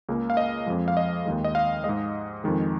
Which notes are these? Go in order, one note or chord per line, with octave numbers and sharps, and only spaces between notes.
C#2 C#3 A#3
F5
D#5
F2 F3 G#3
F5
D#5
D#2 D#3 G#3
D#5
F5
G#2 G#3 D#5
F2 D#3 G#3